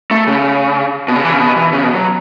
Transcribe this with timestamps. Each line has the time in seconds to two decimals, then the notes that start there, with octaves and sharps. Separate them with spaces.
0.11 A3
0.27 C#3
1.08 B2
1.16 C#3
1.24 E3
1.33 C#3
1.40 B2
1.57 E3
1.73 C#3
1.84 B2
1.95 F#3